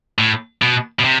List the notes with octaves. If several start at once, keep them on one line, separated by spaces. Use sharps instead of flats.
A2
B2
B2
C3